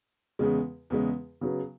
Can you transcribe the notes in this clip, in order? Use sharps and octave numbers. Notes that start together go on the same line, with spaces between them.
E2 C#3 G#3
E2 C#3 G#3
C#3 F#3 B3